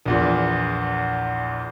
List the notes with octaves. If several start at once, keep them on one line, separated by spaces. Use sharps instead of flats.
A#1 E2 A#2